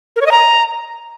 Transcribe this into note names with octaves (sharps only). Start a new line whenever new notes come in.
A#4
C#5
D#5
A#5